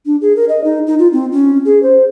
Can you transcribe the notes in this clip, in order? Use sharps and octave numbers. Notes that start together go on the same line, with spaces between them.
D4
G#4
A#4
D#5
D#4
D#4
F4
C4
C#4
G#4
C5